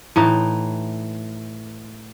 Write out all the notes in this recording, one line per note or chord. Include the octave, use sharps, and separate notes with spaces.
A2 E3 D#4